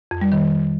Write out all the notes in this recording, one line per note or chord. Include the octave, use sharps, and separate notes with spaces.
F2
G3
D#3